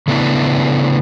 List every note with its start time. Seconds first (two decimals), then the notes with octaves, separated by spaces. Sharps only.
0.08 C#3 A3 B3 D4 E4